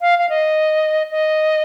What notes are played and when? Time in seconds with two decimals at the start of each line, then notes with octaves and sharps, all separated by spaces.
0.01 F5
0.19 F5
0.29 D#5
1.11 D#5